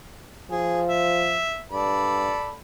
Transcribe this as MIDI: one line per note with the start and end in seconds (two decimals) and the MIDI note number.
0.50 1.39 53
0.50 0.81 68
0.89 1.63 76
1.72 2.33 43
1.72 2.54 69
1.72 2.54 74
1.72 2.54 83